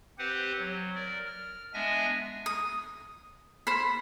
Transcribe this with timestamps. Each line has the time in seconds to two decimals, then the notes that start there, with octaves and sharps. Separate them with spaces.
0.19 C4 G4 B4 C5 F#5
0.59 F#3
0.95 A#4 D5
1.27 F6
1.74 G#3 B3 D4 E5 G#5 A#6
2.46 D#6
3.67 C5 B5